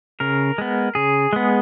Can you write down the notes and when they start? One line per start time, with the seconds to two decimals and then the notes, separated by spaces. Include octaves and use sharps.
0.20 C#3 A#4
0.58 G#3 B3
0.95 C#3 G#4
1.33 G#3 B3